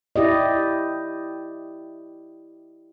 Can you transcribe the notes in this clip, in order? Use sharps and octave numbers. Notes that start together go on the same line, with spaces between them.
E4 G4 D5 D#5